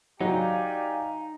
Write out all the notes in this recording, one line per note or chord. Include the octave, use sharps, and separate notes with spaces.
F#3 D#4 G4 D5 F5 G#5